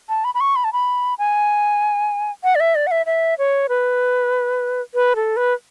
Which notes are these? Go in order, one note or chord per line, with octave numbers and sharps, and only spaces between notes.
A5
B5
B5
C#6
B5
A5
B5
G#5
F#5
D5
E5
D5
F#5
E5
E5
C#5
B4
B4
A4
B4